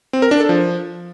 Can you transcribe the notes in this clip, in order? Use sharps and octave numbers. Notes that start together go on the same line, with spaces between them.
C4
A#4
D4
A4
F3